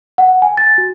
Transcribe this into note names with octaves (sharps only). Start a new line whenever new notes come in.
F#5
G#5
A6
F#4